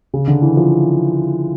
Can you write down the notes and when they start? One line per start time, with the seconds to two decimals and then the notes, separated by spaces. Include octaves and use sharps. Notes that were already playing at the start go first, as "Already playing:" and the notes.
0.14 C#3
0.28 D3
0.42 E3
0.57 F3